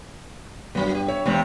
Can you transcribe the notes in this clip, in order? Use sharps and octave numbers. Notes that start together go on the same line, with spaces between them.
G2 C#3 F#3 B3
G4
C#5 E5
E2 G2 C3 G3 G#3